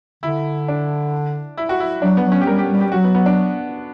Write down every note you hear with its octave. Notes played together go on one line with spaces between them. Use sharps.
D3 E4
D4
E4
F#4
E4
F#3 D4
B3
F#3
C#4
G4
G3 A#4
G4
G3
G4
F#3 F#4
B3
B3
D4